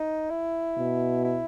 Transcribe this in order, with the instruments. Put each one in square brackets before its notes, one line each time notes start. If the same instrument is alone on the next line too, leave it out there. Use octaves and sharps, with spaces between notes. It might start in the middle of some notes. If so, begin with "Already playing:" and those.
Already playing: [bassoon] D#4
E4
[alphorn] B2
[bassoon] E4